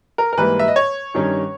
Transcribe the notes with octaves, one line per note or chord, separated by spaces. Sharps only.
A#4
A#4
G#2 E3 G3 A#3 B4
E5
D#5
C#5
G2 D#3 G3 C#4